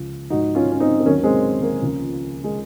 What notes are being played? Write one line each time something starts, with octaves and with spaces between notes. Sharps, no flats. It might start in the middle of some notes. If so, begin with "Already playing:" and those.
Already playing: C#2 C#3 F3
G#2 F3 D#4 F#4
C#4 F4
C#4
C4 D#4
C4
D#2 D#3 F#3 A#3 C#4
G#3 C4
A#3
C#2 C#3 F3
G#3